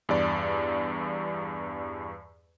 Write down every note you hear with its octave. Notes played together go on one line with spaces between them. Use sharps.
E2 G2 D5